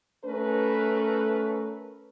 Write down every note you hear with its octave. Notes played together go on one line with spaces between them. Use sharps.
A3 C#4 A#4 B4